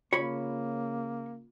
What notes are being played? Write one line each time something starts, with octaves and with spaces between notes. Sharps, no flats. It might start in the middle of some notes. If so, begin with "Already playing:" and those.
C#3 A#3 F4 C#5 B5